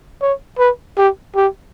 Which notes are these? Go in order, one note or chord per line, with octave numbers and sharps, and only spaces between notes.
C#5
B4
G4
G4